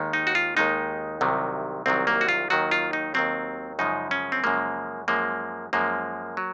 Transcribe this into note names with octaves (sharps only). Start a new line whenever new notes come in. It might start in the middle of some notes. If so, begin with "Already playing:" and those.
Already playing: D#2 D#3 G#3
D#4
F#4
F4
D#2 D#3 G#3 D#4
C2 C3 D#3 F#3
C2 C3 D#3 F#3 C4
A#3
F#4
F4
D#2 D#3 F#3 F#4
F4
D#4
D#2 D#3 F#3 C4
F#2 C#3 F3 G#3 D#4
C#4
C4
F#2 C#3 F3 G#3 A#3
F#2 F3 G#3 A#3
F#2 F3 G#3 A#3
F#3